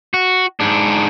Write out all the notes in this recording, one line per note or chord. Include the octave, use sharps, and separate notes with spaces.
F#4
G#2 D4